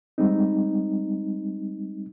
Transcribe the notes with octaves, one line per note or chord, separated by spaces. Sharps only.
G3 G#3 C4 D#4